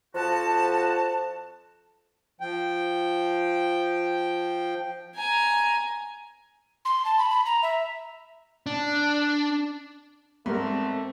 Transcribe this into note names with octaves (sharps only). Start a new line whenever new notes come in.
F2 F3 F#4 A5
F3 G5
G#5 A#5
C6
A5
B5
B5
A#5
E5
D4
G#2 G3 A3 B3 C4 A#4